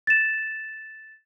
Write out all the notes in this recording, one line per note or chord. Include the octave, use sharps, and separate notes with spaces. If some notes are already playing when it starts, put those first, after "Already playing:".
A6 E7